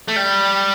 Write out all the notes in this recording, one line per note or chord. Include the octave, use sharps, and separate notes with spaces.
A3
G3